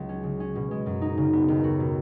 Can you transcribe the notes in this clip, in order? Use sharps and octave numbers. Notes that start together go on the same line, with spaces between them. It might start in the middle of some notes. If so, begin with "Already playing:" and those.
Already playing: C#2 F#3
C#4
C#3
C#4
B2
G#3
F#2
D#4
C#3
B3
D#2
F#4
B2